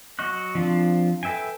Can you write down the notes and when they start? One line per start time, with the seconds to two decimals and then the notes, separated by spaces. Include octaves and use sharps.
0.19 F#3 F#4 D#5 C#6 F#6
0.55 F3 C4 D4 F4
1.23 A4 B4 E5 G5 G#5